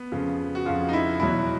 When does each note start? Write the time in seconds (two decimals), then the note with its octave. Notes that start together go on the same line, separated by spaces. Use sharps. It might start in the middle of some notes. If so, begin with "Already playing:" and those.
Already playing: B3
0.12 F2 C#3 F3
0.55 F#4
0.65 F2 C#3 F3 F4
0.89 D#4
0.93 E4
1.20 E2 B2 F#3 E4